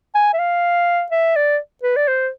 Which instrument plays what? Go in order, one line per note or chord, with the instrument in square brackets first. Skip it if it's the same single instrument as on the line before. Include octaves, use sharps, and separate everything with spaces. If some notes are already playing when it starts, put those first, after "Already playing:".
[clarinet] G#5
E5
F5
E5
D5
B4
D5
C5